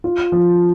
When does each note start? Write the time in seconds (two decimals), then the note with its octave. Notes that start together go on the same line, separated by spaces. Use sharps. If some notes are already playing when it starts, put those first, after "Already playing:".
0.04 F4
0.32 F3